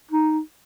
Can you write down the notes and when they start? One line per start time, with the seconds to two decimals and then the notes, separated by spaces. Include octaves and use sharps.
0.11 D#4